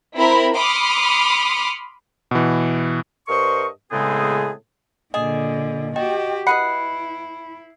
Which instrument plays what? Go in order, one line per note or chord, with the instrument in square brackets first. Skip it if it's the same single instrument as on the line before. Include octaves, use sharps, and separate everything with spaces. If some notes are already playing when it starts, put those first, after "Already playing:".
[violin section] C4 E4 A#4 B5
B5 C6 D6 D#6 F6 C#7
[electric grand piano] B2 E3
[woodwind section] G2 A#4 C5 D#5 C#6
A2 C#3 G#3 B3 C4 G#4
[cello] A#2 D3 [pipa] G#4 [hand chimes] D#5
[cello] F#4 G4 [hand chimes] D#5 G5
[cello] E4 [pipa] B4 D#5 F#5 [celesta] B5 C#7 [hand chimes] C7